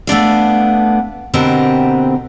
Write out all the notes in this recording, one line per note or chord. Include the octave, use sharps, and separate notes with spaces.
A3 B3 D4 F5
B2 D3 B3 C4 G4 A#4